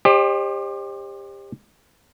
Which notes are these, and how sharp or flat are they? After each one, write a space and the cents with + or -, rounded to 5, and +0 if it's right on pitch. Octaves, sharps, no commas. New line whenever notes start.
G4 +25 C5 +30 D#5 -45